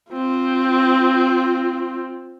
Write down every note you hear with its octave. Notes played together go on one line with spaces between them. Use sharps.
C4 F4